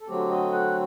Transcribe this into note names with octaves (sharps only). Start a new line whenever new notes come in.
A4
D3 F#3 A3 C4 G4
D#5
F#5